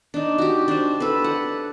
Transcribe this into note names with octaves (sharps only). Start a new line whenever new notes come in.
D4 D#4
F#4 G4
D4 C5
A4 B4
F#5